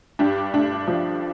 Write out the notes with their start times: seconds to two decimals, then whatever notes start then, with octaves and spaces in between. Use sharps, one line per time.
0.19 G2 D4 G4
0.54 A3 D4
0.88 F3